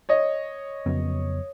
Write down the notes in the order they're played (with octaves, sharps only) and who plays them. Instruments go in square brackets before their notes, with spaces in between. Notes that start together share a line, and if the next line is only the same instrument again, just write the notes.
[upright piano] C#5 D#5
[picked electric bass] F2 C#3 F#3 B3